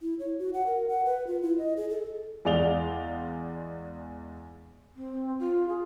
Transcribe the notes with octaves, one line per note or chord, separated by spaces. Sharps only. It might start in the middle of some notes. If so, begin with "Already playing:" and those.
E4
C#5
F#4
F#5
A#4
F#5
B4
F4
E4
D#5
G#4
A4
E2 G#3 D5 F5 F7 G7
C4
F4
G#4